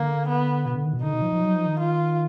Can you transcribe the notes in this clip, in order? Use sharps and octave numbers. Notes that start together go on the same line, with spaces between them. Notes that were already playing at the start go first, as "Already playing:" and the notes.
Already playing: D3 A#3
B3
B2
D3
D#3
B2
D3 D#4
B2
F3
F3
F#3
F3
D#3
F4